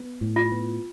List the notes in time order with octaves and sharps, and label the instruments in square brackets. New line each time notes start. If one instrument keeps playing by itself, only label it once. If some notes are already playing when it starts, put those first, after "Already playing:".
Already playing: [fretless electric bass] B3
A2
[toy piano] F4
[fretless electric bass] B3